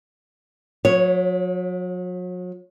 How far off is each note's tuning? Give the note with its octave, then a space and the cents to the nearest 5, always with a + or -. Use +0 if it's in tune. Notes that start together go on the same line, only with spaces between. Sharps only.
F#3 -40 C#5 +0